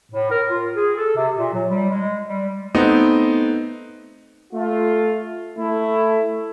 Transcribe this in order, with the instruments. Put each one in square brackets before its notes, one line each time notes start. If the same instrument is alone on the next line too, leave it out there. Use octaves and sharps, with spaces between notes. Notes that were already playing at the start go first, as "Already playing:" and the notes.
[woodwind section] A2
A#4
F4
G#4
A4
C3
A#2
F#3
G3
G#3
G3
[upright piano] A3 B3 C4 D#4
[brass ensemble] A3 F4
A3 E4